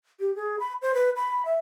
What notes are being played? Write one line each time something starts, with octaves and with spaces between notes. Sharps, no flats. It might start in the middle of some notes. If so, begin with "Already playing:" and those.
G4
G#4
B5
C5
B4
B5
E5